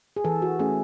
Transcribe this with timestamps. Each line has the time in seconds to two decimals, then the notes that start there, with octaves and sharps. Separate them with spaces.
0.16 G#4
0.24 E3 A4
0.42 F#4
0.59 A3 C#4 G#4